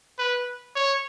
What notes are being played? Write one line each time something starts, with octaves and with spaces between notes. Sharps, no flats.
B4
C#5